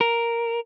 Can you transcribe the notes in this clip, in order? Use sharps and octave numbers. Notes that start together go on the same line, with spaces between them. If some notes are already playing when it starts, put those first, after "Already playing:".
A#4